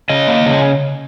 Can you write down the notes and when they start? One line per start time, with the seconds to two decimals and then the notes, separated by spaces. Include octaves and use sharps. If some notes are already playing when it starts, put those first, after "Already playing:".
0.09 C#3 D#5
0.28 A#3
0.46 C#3